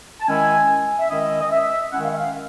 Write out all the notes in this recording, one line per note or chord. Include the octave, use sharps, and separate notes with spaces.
A5
D#3 G#3 C#4 E4 G#5
E5
D#3 G#3 C#4 E4 D#5
D#5
E5
D#3 G#3 C#4 E4 F#5
F5
E5
F5